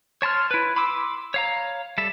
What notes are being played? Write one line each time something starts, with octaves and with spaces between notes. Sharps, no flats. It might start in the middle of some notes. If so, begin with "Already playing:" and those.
C#5 A5 C6 F6
E4 B4
B5 C6 D6 E6
C#5 F5 A#5
G3 A4 E5